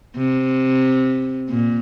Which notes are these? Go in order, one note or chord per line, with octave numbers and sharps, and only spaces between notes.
C3
A#2